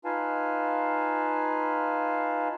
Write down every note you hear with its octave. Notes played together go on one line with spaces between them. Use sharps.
D#4 F4 B4 F5 G#5 A5